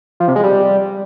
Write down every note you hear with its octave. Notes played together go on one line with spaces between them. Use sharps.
F3
C3
G#3
G3